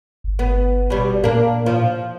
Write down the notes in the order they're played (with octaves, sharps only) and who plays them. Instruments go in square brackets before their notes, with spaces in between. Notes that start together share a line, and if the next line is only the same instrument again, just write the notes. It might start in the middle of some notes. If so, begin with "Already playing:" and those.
[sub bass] G1
[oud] B3
B2 G3
[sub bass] A#2 [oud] A#3 D4
[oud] F3